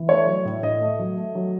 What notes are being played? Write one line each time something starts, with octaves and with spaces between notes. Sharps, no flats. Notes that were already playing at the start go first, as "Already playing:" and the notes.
Already playing: E3
A3 C#5
F#3
A2
A2 D#5
A3
F#3
A3
F#3